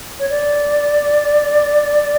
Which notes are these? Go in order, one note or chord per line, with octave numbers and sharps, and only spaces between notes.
C#5
D5